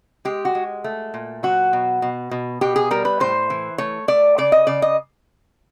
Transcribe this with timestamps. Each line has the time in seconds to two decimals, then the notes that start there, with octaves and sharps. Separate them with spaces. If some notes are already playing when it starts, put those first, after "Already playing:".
0.25 G#3 G4
0.45 F#4
0.55 G#3
0.84 A3
1.14 A#2
1.43 F#3 F#4
1.73 B2
2.02 B2
2.31 B2
2.61 B2 G4
2.76 G#4
2.91 G3 A#4
3.05 B4
3.20 A2 C5
3.50 E3
3.78 A3 C#5
4.08 A3 D5
4.38 C#3 D5
4.52 D#5
4.67 C#3 D5
4.82 D#5